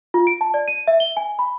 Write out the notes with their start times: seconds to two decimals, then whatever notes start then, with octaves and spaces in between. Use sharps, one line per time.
0.14 F4
0.27 D7
0.41 A5
0.54 D5
0.68 D#7
0.87 E5
1.00 G7
1.17 G#5
1.39 B5